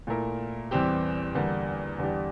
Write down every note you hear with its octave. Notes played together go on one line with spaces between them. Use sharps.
A#2 A3 E4 A#4
E2 E3 G3 C4 G4
E2 D3 G3 A#3
E2 D3 G3 D4 G4